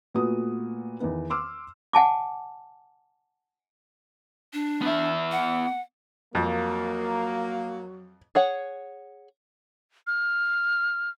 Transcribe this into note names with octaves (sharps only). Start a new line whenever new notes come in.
A#2 A3 B3 F#4 D#6
E2 D#3 B3
C6 D6 E6 F6
F#5 G#5 A5 D6
D4
B3 E5
F#5
F2 F#3 A#3
G#4 C#5 F#5
F6